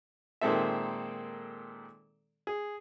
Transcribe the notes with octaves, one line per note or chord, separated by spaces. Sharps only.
A#2 D#3 G#3 C4 A4 E5
G#4